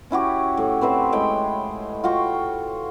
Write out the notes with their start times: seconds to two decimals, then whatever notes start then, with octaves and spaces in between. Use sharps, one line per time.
0.11 C#4 E4 F#4 G4
0.57 A2
0.81 C4 B4 C5 E5
1.12 A2 G#3 G5 B5
2.04 F4 F#4 G5 C#6